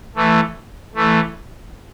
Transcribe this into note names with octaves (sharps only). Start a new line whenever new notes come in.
E3 A3
E3 A3